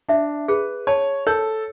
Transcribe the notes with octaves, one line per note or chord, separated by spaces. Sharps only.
D4 E5
G#4 B4
C#5 A5
A4 C#5